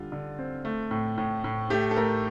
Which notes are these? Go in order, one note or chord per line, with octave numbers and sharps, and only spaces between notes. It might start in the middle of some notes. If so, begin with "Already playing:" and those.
Already playing: D3 G3 F4
D3
C4
A3
A2
A2
A2
A3 G4
A4
A3 A#4